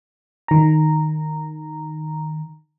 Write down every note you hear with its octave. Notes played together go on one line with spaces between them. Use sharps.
D#3 A#5